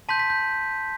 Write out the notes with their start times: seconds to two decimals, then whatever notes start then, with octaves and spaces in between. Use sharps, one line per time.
0.09 A5 C6 G6 B6
0.19 B6
0.30 G6